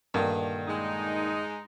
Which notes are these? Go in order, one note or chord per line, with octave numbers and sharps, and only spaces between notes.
G2 A#2 D3 D#3
G#3 D#4